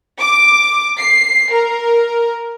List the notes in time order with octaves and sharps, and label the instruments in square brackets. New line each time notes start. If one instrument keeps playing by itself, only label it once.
[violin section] D6
C7
A#4